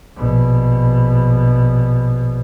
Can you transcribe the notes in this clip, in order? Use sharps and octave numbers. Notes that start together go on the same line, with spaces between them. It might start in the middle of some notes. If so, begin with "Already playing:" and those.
A#1 B2